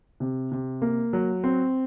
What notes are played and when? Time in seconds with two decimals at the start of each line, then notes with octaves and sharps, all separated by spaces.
0.20 C3
0.52 C3
0.82 A#3
1.13 F#3
1.44 C4